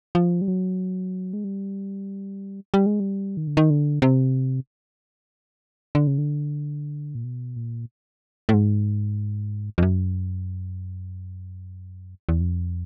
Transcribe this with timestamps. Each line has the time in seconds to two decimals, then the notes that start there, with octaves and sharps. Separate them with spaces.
0.15 F3
0.41 G3
0.48 F#3
1.33 G#3
1.44 G3
2.74 G3
2.86 G#3
3.00 G3
3.37 D#3
3.47 D3
3.57 D#3
3.70 D3
4.02 C3
5.95 D3
6.07 C#3
6.18 D3
7.15 A#2
7.24 B2
7.56 A#2
8.49 A2
8.54 G#2
9.78 F2
9.83 F#2
12.29 E2
12.41 F2